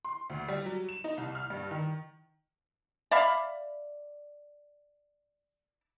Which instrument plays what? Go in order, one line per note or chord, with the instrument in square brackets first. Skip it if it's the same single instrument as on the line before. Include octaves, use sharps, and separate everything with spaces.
[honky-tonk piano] C6
D2
G3
F#3
E7
D#4
C2
F6
G2
D#3
[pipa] D5 E5 F5 B5